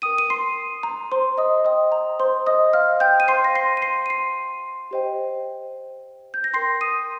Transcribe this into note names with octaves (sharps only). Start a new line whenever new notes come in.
A#4 G5 D#6 D#7
D#7
C6 C7
A#5
C5 C6
D#5 D#6
C5 D#5 G5 D#6
A#5
C5 C6
D#5 D#6
F5 F6
G5 G6
D#7
C5 F5 C6 C7
A#6
C6 C7
D#7
C6 C7
D#7
C6 C7
G4 C5 D#5 G5
G6
A#6
A#4 G5 C6 C7
D#6 D#7